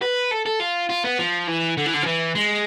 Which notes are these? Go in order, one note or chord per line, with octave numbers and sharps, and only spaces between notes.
B4
A4
A4
F4
F4
B3
F3
E3
D3
E3
D3
F3
E3
G#3